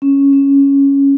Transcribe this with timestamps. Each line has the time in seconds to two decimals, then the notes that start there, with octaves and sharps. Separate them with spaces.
0.02 C#4
0.33 C#4